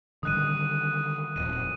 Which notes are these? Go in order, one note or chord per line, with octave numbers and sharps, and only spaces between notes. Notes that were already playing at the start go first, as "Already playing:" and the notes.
D3 D#3 G3 D#6 F#6 D#7
D#1 F2 D#7